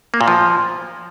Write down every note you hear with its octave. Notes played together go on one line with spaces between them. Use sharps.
A#3
A#2
F3